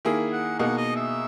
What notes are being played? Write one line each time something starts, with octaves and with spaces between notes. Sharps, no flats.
D#3 A#3 E4 G#4
F#5
B2 A#3 D#4 G#4 F#5
D#5
E5